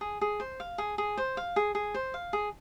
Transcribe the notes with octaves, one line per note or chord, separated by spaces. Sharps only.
G#4
G#4
C5
F5
G#4
G#4
C5
F5
G#4
G#4
C5
F5
G#4